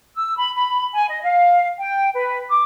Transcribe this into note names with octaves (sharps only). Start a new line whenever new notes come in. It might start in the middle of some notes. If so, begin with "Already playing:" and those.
E6
B5
B5
G#5
D#5
F5
G5
B4
D6